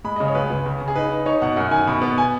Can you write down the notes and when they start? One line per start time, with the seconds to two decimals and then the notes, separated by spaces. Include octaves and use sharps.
0.04 G#3 B5
0.16 C#3 D#5
0.26 C#5
0.35 C#2 B4
0.50 C#2
0.66 C#3
0.81 C#3
0.88 G#4
0.96 D#4 B4
1.12 D#4
1.26 D#4 C#5
1.42 B2 F#5
1.56 F#2 F#5
1.71 D#3 G#5
1.87 B2 B5
2.01 B3
2.18 G#5